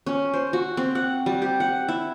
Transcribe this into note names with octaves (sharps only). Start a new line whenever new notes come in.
C#4
C5
F#4
C4
F#5
G3
G4
F#5
E4